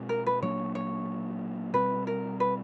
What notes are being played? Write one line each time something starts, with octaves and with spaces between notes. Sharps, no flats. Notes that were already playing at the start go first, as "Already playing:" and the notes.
Already playing: B2 G#3 C4
A#4
B4
A#2 F#3 A#3 D4 C#5
C#5
B2 G3 C4 B4
A#4
B4